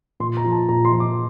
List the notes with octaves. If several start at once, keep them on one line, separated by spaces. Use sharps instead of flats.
A#2 C6
A#5
F3
A5
A#2 A#5
C6
F3
D6